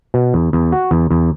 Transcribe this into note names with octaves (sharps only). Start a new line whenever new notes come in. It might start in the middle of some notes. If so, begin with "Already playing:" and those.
B2
E2
E2
F#4
E2
E2